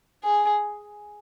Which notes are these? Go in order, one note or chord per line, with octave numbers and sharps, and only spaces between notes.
G#4